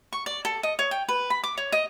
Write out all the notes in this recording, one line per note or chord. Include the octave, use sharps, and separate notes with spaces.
C#6
D5
A4
D#5
C#5
G5
B4
B5
D6
C#5
D#5